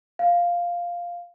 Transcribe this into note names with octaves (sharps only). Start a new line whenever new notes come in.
F5